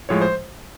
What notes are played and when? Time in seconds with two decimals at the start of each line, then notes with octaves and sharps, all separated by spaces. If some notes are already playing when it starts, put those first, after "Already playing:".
0.09 A2 F3 G#3 C#5
0.22 C5